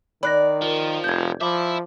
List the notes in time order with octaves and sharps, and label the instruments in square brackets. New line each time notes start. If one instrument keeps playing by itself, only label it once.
[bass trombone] D#3 [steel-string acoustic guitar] D5 [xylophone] B5 F#6 A#6
[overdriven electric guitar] F3 [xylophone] A#4
[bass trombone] F1 [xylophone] G6 G#6
[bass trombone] F3 [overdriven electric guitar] E5 B5 [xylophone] D6